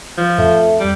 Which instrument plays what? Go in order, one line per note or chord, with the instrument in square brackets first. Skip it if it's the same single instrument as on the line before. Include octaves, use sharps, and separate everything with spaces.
[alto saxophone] F3
[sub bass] F2 [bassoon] A3
[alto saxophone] G3